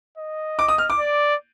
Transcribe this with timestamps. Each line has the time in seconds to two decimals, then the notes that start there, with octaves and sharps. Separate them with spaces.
0.18 D#5
0.59 D6
0.68 D#6
0.78 F6
0.90 D6
0.99 D5